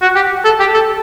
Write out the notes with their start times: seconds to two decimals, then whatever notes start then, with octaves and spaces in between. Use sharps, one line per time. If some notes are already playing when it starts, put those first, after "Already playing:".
0.02 F#4
0.15 G4
0.45 A4
0.60 G4
0.74 A4